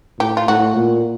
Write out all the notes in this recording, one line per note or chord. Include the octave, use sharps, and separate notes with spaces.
A2 G4
F4
A2 F#4
A#2